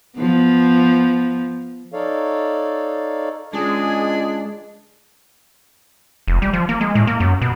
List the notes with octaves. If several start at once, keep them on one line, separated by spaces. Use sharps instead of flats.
F3 B3
D#4 A4 C#5 D5 F5
C#2 G#3 D4 G#4
F1
G3
F3
A#3
G#3
A2
A#3
F#2
B2